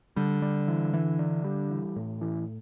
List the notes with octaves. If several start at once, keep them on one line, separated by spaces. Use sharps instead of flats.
D3 G3
G3
E3
E3
D4
G3
E3
A2
E3